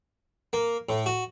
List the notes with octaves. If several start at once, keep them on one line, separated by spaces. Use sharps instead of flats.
A#3
A2
F#4